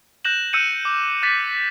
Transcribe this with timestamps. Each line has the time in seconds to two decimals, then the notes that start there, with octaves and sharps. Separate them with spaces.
0.25 F#6 G6 A#6 E7 F#7
0.53 E6 F#6 G6 C#7 D#7 E7
0.85 D6
1.22 D6 F#6 A6 B6